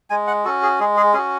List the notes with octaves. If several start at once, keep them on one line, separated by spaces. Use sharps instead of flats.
G#3 G#5
F#5
C#4 F#4 A4
G#4
G#3 G#4
G#4
C#4 F#4 G#4